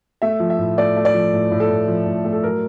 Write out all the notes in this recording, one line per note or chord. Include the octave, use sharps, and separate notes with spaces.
A3 E5
F3
E5
A2
A3 D5
A3
D5
F3
A2
A2
A4
A2
F3
A2
A3
A4
F#3 A#4